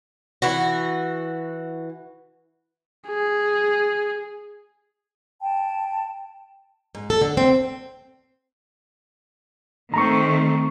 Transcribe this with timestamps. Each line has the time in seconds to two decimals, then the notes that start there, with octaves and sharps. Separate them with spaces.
0.42 E3 F#4
3.08 G#4
5.41 G5 A5
6.95 G#2
7.10 A4
7.22 D3
7.37 C4
9.94 D#3 A3 C4 A#5 C#6